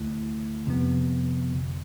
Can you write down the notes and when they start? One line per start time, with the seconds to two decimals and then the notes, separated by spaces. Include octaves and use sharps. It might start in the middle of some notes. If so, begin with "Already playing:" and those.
Already playing: D2 D3 A3 E4
0.66 F2 C3 F3 B3
1.52 G1 F2 D3